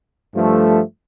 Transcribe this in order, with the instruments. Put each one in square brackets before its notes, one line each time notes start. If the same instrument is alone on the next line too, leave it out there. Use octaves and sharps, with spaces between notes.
[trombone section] G2 F3 A3